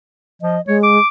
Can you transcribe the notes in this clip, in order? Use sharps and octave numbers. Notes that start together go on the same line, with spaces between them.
F3 D#5
G#3 C#5
D6